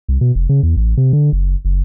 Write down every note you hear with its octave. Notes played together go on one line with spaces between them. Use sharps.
C2
B2
F1
C#3
E2
A1
C3
D3
F#1
F#1